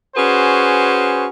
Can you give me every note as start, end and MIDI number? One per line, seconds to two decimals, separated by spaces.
0.16 1.27 61
0.16 1.27 66
0.16 1.27 68
0.16 1.27 71
0.16 1.27 72